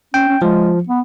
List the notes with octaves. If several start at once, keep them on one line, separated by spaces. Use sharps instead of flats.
C#4 G5
C#4
F3 G#3
B3